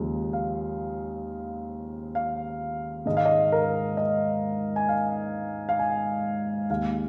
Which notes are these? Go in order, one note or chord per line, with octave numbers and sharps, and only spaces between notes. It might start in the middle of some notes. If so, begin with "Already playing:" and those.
Already playing: D#2 C#3 F3 G#3
F5
F5
G#2 D#3 G#3 D#5
F5
D#5
A#4
D#5
G#5
F5
F5
G#5
D#2 D#3 G#3 F5